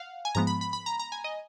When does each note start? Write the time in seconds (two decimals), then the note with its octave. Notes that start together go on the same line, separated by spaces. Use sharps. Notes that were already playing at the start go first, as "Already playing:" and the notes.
Already playing: F5 F#5
0.25 G#5
0.35 G#2 F3 G#3 B3 A#5
0.47 B5
0.61 B5
0.73 B5
0.86 A#5
1.00 A#5
1.12 G#5
1.24 D#5